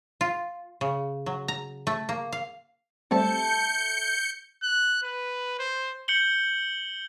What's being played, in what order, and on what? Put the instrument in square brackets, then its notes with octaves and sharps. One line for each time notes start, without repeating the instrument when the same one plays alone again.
[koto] F4
C#3
F#3
A#5
A3
A#3
F5
[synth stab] G3 A3 C4 [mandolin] A4 E5 A5 [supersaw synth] G6 C#7
[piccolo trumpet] F#6
B4
C5
[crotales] G6 C#7 F#7 G7